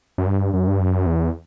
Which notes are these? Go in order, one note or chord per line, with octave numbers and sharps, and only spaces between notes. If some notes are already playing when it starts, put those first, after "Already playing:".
F#2
G2
F#2
G2
F#2
E2